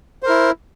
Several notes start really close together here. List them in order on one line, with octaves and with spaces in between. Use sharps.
C5 A#4 E4